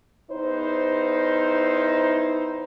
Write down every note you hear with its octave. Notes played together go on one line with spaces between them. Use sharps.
E2 D#4 E4 C5